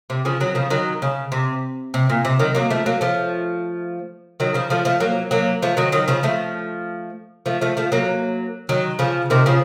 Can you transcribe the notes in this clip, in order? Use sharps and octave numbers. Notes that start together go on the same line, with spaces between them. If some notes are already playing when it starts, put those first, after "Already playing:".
C3
C#3 F3
D#3 F#3
C#3 F3
D#3 F#3
C#3
C3
C3
A#2
C3
D#3 F#3
F#3 A#3
F3 A3
F#3 A#3
F3 A3
D#3 F#3
C#3 F3
F3 A3
F3 A3
F#3 A#3
F#3 A#3
F3 A3
D#3 F#3
D#3 F#3
C#3 F3
F3 A3
F3 A3
F3 A3
F3 A3
F#3 A#3
D#3 F#3
C#3 F3
C3 D#3
C#3 F3